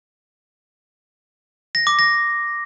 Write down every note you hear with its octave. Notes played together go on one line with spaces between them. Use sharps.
A#6
D6
A#6